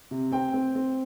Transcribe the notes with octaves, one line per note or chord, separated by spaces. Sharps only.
C3
C4 G5
C4
C4